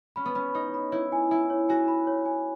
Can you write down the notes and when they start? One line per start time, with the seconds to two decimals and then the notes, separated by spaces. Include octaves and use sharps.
0.16 C#4 B5
0.25 B3
0.35 C#4 B5
0.55 D#4 C#5
0.74 B5
0.92 E4 C#5
1.12 G#5
1.31 E4 G#5
1.50 C#5
1.69 F#4 G#5
1.88 B5
2.07 C#5
2.26 G#5